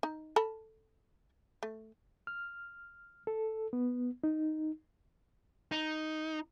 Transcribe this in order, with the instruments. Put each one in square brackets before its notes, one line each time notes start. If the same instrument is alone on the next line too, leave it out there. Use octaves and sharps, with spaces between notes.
[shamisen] D#4
A4 A5 B5
A3
[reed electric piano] F6
A4
B3
D#4
[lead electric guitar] D#4